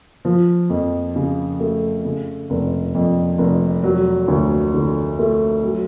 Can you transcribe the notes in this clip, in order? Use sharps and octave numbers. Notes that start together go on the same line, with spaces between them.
F3
F2
C#3
A3
C#3
F1
F2
F1
F#3
D2
D3
A3
F#3